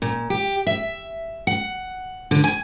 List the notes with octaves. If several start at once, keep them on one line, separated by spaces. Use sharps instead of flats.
A#2
G4
E5
F#5
D3
G#5